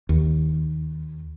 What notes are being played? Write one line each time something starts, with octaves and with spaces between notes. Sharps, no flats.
D#2